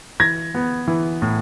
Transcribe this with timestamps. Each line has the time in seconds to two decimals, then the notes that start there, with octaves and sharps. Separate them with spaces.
0.20 E3 G#6 A#6
0.55 B3
0.88 E3
1.22 A2